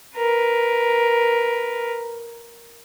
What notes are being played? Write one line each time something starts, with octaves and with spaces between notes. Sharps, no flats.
A#4 B4